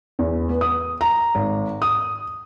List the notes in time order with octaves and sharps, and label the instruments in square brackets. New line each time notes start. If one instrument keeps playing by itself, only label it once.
[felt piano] E2
B3
D#6
A#5
G#1
D#6